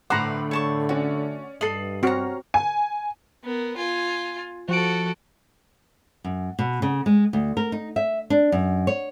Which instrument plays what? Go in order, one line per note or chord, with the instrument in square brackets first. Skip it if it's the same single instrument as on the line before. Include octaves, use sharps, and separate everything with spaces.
[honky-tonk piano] A2 D6 [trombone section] D3 A3 [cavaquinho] B4 C5 [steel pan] F#5 A#5
[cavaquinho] C#5 A5 C#6
[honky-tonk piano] C#4 D5 [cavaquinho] F#4
[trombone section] G2 [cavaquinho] A4 D#5 [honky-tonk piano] C7 F#7
[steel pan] C4 F#4 [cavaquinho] C#5 A#5 [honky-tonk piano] F6
[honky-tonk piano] G#5
[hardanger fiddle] B3 A#4
F4 G#5
[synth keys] F3 D7 [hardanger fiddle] F#4 A4
[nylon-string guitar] F#2
B2
C#3
G#3
D2
A#4
D#4
E5
D4
F#2
C#5